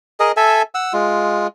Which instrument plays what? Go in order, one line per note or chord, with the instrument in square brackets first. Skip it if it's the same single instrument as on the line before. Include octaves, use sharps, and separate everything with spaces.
[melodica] G#4 A#4 D#5
A4 E5 G#5
F#5 E6
G#3 F4